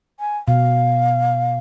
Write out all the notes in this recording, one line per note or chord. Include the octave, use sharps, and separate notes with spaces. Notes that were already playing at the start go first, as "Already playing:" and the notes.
G#5
B2 F5